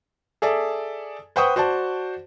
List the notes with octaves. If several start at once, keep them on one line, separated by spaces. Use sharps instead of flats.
G#4 A4 D5 E5
B4 C5 F#5 G5 C#6 D#6
F#4 C5 D5 A5